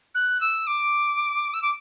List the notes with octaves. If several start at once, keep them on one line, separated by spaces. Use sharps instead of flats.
F#6
E6
D6
E6
D6